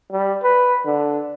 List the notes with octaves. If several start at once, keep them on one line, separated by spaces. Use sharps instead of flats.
G3
B4
D3